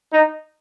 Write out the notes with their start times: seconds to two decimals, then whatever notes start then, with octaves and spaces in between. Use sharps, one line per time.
0.13 D#4